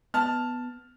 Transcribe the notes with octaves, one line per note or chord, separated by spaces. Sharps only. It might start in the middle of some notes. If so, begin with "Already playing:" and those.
B3 A5 F6